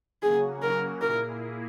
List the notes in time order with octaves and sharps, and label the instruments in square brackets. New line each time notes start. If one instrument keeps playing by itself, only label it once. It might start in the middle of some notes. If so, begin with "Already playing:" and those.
[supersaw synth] C#3 F#3 A#3 C#4 F#4 [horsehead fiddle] G#4
[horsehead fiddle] A#4
[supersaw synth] A#2 A#3 E4 G#4 [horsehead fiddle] A#4